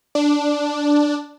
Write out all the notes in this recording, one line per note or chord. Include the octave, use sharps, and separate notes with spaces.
D4